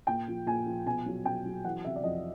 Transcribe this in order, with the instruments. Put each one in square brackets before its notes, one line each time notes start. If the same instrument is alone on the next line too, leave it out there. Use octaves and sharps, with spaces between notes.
[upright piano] A#2 G5
F3
A#2 G#5
F3
B2 G#5
F#3
B2 G5
F#3
E3 F#5
C3 E5
D5
F2 D#5